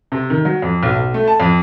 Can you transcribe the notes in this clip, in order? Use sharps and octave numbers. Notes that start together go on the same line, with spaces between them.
C3
D#3
F#3
F2
B1
B1
A3
A5
F2